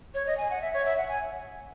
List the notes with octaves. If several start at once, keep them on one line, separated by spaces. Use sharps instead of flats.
C#5
D#5
G#5
F#5
E5
C#5
E5
F#5
G#5